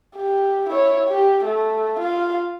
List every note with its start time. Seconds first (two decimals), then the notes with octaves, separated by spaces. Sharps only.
0.16 G4
0.70 E4 C#5
1.08 G4
1.45 A3
1.99 F4 F5